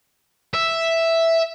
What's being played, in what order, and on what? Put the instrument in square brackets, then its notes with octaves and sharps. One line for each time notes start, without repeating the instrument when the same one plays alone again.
[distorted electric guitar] E5